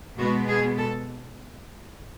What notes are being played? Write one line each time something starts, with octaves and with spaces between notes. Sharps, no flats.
B2 G#3 B3 F#4
G#4
A4